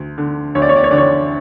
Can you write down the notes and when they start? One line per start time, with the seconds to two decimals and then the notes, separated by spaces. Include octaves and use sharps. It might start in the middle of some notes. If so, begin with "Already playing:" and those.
Already playing: D2
0.18 D3
0.55 D2 C#5
0.62 D5
0.69 C#5
0.76 D5
0.84 C#5
0.91 D3 D5
0.98 C#5